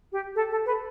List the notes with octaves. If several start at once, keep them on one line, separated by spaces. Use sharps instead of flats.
G4
A4
A4
B4